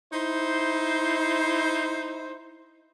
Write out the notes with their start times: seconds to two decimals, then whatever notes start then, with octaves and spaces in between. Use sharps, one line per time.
0.12 D#4 E4 C5